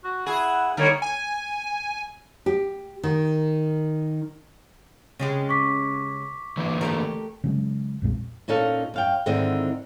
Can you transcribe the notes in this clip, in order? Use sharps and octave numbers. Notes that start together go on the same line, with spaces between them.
F#4
E4 G#4 F#5
D3 G3 A#3 D#4 C#5
G#5
G4
D#3
C#3 G#3 G4
C#6 D6 B6
D3 E3 A#3
A3 G4 A#4
C#3 F#3 G#3
B1 F2 A#2 G#3
A#2 C#4 D#4 A4 F5
F#2 F5 G5
G#2 D3 D#3 C4 E4 D#5